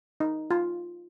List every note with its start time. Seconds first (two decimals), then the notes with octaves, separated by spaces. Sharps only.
0.20 D#4
0.51 F4